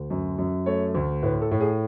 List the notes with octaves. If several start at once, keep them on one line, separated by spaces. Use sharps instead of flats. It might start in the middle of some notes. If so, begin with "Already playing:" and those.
Already playing: D2
F#2
F#2
A3 C#5
D2
A2 B4
A4
A2
G#4